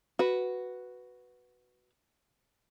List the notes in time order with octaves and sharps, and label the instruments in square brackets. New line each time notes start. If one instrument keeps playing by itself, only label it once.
[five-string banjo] F#4 B4